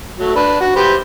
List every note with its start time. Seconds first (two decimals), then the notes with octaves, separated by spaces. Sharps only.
0.19 F#3 A3
0.35 D4 B4
0.60 F#4
0.76 G4 B4 C5